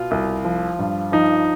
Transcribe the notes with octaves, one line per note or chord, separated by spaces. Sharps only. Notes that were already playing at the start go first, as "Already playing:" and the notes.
Already playing: B2 F4
C2
F3
G2
F3 D#4